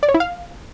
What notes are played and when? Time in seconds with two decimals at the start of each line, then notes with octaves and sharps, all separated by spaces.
0.03 D5
0.09 C#5
0.14 E4
0.20 F5